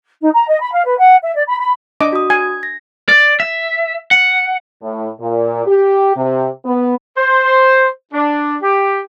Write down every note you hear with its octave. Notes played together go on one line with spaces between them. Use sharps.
D#4
A#5
D#5
B5
F5
B4
F#5
E5
D5
B5
B5
D4 D#5 D6
F#4 D#6
G#5 G#6
A#6
D5
E5
F#5
A2
A#2
G4
C3
B3
C5
D4
G4